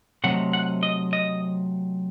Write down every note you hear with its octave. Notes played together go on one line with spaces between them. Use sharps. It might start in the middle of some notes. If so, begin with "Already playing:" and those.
C3 F#3 A3 C4 D#4 F#5
F#5
D#5
D#5